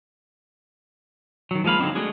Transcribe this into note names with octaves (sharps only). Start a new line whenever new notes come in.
D#3 F#3
F3 G#3 A#3 F5 B5
D3 F#3 C4 D4 D#4
G#3 A3 D4 F#4 G#4